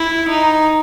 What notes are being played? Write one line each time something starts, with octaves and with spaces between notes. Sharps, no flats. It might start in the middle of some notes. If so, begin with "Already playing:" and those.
Already playing: E4
D#4